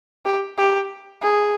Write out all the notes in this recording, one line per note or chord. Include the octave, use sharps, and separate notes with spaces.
G4
G4
G#4